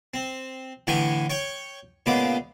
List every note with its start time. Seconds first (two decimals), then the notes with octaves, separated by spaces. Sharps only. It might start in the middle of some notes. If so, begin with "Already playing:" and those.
0.14 C4
0.87 A2 D3 E3 G5 G#5 C#6
1.30 C#5 G5 C#6
2.06 A#2 C#3 G#3 B3 B5 D6